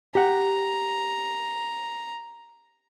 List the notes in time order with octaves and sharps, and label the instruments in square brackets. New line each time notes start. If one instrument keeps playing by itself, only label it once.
[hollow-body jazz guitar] G4 F#5 [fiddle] A#5